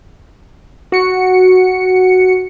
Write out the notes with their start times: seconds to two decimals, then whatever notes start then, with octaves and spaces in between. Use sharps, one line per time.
0.92 F#4 C#7